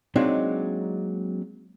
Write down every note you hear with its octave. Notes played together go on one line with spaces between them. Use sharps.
F#3 G#3 A#3 C4 D4 D#4